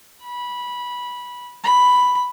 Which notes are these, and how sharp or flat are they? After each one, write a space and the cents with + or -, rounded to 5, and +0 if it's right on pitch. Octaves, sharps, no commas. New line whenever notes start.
B5 -15
B5 +5